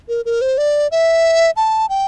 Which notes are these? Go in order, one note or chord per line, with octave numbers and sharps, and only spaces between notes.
A#4
A#4
C5
D5
E5
A5
G5